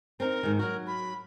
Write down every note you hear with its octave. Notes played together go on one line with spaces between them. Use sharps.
C4 C#4 D#4 A#4
G#2 D#3
F#3 F#4 A#4
B5